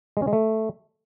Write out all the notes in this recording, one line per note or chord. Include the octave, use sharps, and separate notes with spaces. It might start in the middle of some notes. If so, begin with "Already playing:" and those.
G#3
C#4
G#3
A3